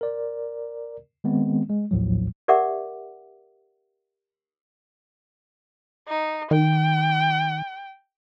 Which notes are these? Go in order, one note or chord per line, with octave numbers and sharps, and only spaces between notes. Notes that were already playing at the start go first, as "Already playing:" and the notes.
A#4 D5
D#3 G#3 B3 C4
G#3
A#1 D#2 A2 F3 F#3
G4 A#4 D5 E5 F#5 D6
D#4
D#3 G5